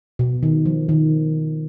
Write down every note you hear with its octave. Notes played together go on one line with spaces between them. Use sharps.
B2
D#3
F3
D#3